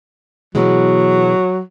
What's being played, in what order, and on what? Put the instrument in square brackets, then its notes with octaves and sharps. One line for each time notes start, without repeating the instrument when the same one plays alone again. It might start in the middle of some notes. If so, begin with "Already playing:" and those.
[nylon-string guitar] B2 E3 G#3 [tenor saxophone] F#3